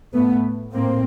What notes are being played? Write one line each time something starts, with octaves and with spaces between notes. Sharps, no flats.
A2 A3 B3
A2 A#3 C4